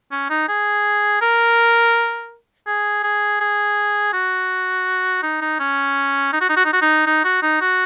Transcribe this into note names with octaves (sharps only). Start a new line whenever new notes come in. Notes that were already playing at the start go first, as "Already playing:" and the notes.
C#4
D#4
G#4
A#4
G#4
G#4
G#4
F#4
D#4
D#4
C#4
D#4
F#4
D#4
F#4
D#4
F#4
D#4
D#4
F#4
D#4
F#4